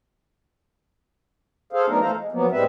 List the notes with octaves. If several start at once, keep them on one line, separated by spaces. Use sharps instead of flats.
G#4 A4 C5 F5
F#3 A3 B3 D4 D#4 A#4
E3 A3 A4 C5 F5 A#5
G#3
F3 F#3 A#3 B3
A2 G3 G#3 C4 B4 E5